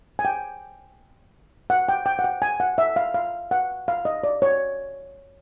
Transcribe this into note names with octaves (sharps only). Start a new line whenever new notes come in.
G#5
G5
F#5
G5
G5
F#5
G5
G#5
F#5
E5
F5
F5
F#5
F5
D#5
D5
C#5